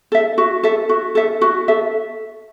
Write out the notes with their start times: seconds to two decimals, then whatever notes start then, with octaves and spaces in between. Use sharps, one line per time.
0.12 A4 E5
0.38 F#4
0.63 A4 E5
0.89 F#4
1.15 A4 E5
1.41 F#4
1.68 A4 E5